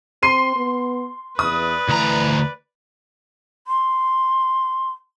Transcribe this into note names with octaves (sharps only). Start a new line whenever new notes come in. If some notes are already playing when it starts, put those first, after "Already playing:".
C4 C6 C7 D#7
B3
E2 B4 D5 D#6
D2 E3 A#5
C6